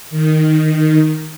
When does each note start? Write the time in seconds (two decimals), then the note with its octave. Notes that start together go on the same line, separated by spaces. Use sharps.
0.10 D#3